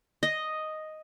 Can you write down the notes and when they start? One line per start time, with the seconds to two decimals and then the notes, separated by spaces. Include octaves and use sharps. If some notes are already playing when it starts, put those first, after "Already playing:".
0.23 D#5